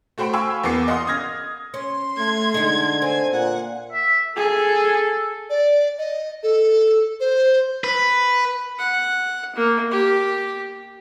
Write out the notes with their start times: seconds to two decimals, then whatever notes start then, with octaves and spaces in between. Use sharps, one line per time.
0.18 A3 F#4 C5 G5 B5 D7
0.33 F5 G5 G#5 B5 C#6 E6
0.64 E2 A#3 B3 D6 C7
0.88 D#5 F5 F#5 C6 D#6
1.07 D#6 F6 G#6 A#6
1.74 C#4 C6
2.18 A3 G#6
2.54 D3 G#3 D#4
3.02 C4 G#5
3.32 A#2 F#5
3.92 E5
4.36 G#4 A4
5.50 D5
5.98 D#5
6.43 A4
7.20 C5
7.84 B4
8.79 F#5
9.55 A#3
9.91 G4